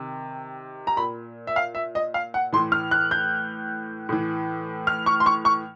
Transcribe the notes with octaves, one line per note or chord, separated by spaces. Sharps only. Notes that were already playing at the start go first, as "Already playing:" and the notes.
Already playing: C3 D#3
A#5
A#2 B5
E5
F5
E5
D#5
F5
F#5
A2 E3 C6
F6
F#6
G6
A2 E3
F6
C#6
C6
C#6
C#6